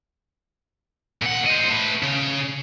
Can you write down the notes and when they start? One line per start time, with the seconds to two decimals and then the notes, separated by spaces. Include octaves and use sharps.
1.22 A#2 F#5
1.47 C5 D#5
1.70 A3 B4
2.03 C#3